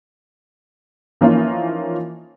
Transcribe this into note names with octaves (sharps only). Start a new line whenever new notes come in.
E3 F3 A#3 C#4 D#4 F4